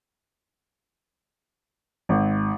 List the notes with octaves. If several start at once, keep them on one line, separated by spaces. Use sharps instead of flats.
G#1